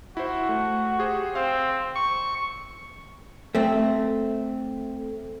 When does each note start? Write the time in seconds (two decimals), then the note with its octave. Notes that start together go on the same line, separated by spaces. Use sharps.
0.17 E4 F#4 C5
0.49 A3
0.99 G4 G#4 C5
1.35 C4 F5
1.96 C#6
3.55 A3 C4